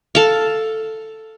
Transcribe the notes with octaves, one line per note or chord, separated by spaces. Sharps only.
A4 F5